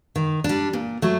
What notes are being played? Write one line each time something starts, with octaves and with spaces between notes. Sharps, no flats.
D#3
G3 D4
A#2
F#3 A3